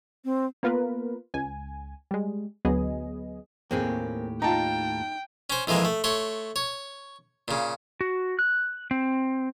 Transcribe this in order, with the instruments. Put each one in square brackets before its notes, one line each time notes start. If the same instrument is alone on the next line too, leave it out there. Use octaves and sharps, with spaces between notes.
[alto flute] C4
[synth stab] A#3 B3 F4 A#4 B4
C#2 G#5
G3 G#3
D2 F#3 B3 G#4 D#5
[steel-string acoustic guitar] D#2 A2 G4 [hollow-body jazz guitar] A#3 C4 G#4
[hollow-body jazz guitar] D#4 [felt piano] F4 A5 A#5 [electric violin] G5
[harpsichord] C#4 C5
F2 E3 F3 G#3 A#3
A3
A3 C#5 C6
C#5
A#2 C#3
[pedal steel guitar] F#4
F#6
C4